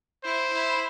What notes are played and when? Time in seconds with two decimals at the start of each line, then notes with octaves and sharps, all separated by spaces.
0.23 E4 C5
0.52 E4